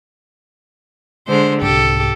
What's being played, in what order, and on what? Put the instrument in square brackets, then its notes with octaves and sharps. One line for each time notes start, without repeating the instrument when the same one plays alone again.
[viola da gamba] D3 G#3 C5
[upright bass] C2 G#2 [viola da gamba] G4 A4